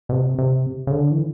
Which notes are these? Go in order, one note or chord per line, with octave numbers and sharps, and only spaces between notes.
B2
C3
C3
C#3
D3
E3